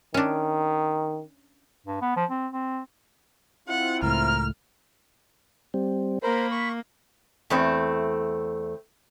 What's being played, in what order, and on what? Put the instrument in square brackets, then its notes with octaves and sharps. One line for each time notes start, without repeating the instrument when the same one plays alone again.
[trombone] D#3 [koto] C#4 D4
[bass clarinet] G2
B3
F3
C4
C4
[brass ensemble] C4 E4 F4 [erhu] F#5
[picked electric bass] C#2 A2 [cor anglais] A#4 [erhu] F6
[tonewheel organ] G3 C4
[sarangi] A#3 [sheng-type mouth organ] A#4 C5 [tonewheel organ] B5
[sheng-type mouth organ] C#6
[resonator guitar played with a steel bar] E2 A3 C4